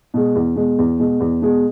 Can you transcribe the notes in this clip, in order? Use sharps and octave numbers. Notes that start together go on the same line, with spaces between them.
B2 G#3
E2
B2 G#3
E2
B2 G#3
E2
B2 G#3